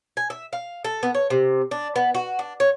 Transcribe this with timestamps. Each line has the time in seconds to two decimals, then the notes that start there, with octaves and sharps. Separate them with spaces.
0.17 G#5
0.30 E5
0.53 F5
0.84 A4
1.03 B3
1.14 C#5
1.30 C3
1.71 D4
1.96 B3
2.15 F#4
2.39 D4
2.60 C#5